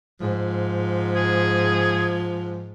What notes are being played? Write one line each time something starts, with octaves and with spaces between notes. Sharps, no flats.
G#2 F3
G#4